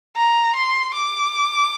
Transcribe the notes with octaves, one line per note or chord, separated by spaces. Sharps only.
A#5
C6
D6